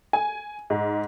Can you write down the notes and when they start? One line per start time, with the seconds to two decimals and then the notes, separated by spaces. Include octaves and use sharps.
0.13 G#5
0.70 G#2